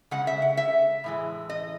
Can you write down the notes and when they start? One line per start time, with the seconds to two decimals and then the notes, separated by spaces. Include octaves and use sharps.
0.11 C#3 G#3 F#5
0.27 E5
0.42 F#5
0.57 E5
1.04 A2 E3 G#3
1.49 D#5